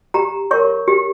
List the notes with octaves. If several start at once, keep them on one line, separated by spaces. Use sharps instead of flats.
G4 A#5
A#4 C#5 C#6
G4